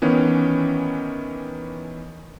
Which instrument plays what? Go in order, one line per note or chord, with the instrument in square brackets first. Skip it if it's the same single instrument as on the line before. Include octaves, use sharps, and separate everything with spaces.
[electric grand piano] D#3 E3 B3 C#4